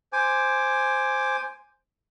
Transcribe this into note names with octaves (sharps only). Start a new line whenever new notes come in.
C5 G#5 D6